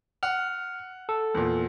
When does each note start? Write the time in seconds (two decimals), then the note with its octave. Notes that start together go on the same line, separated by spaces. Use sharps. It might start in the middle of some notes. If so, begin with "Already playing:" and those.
0.23 F#5 F6
1.09 A4
1.34 E2 A#2